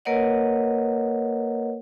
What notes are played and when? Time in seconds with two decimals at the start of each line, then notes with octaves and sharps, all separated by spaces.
0.05 A#3 A#4 B4 C#5 D#5 F#5